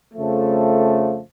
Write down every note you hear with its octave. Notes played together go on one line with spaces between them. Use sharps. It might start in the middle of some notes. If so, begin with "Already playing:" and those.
F2 C#3 F3 A3